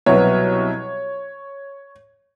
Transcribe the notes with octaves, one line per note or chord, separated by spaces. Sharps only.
C2 B2 F#3 C#5